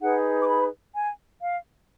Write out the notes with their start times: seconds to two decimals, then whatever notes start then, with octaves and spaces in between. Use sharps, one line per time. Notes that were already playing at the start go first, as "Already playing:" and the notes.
0.01 D#4 G#4 B4 F#5
0.42 D6
0.48 B5
0.94 G#5
1.42 F5